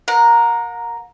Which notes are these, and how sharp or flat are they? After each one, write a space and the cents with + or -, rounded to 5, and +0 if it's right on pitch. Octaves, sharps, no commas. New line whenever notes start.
A#4 +0 F#5 -40